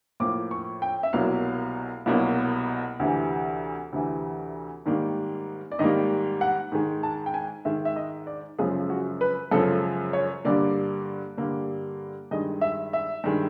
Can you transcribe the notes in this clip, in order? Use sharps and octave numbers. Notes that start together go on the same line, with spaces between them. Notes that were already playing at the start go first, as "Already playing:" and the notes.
A2 F3 A#3 D6
C#6
G5
E5
C2 B2 F#3 A#3 F5
C2 B2 F#3 A#3
D2 C3 E3
D2 C3 E3
G#2 D#3 G3 A#3
D5
G#2 D#3 G3 A#3 D#5
F#5
G#2 D#3 G#3
A5
G5
G#5
G#2 D#3 G#3 E5
E5
D#5
D5
F#2 C#3 F3 G#3 G#4
F#4
B4
F#2 C#3 F3 G#3 A4
C#5
G2 D3 G3 A#3 D5
G2 D3 G3 A#3
G2 D#3 G#3 D#5
E5
E5
G2 D#3 G#3